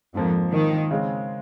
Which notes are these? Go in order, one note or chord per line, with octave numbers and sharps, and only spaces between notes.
F2 G#2 F3 A#3
D#3
C#3 G#3 C4